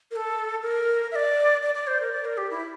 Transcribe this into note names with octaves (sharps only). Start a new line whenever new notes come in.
A#4
A4
A#4
E5
D5
D5
D5
C5
A#4
D5
A#4
G4
E4